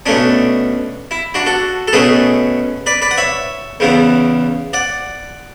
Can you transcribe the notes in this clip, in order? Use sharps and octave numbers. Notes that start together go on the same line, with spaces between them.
B2 A3 C#4 D4
E4
D4 F#4
F#4 A4
A4
B2 A3 C#4 G#4 B4
B4 D5
B4 D5
F#5
C#5 E5
E2 C#3 E3 B3
D5 F#5